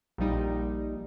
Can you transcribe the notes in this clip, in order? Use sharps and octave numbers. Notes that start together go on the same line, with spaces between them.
A#1 A#2 G3 D#4